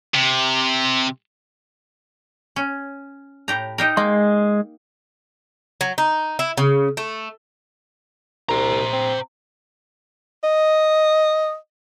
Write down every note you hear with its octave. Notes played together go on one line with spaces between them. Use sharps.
C3
C#4
A2 G4 A#5
D#4 G4 A#4
G#3 A#3 D#5 C6
F#3
D#4
E4
C#3
A3
C2 C5 A#5
C4
D#5